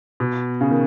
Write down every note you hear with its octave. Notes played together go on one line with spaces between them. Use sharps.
B2
C#3
D#3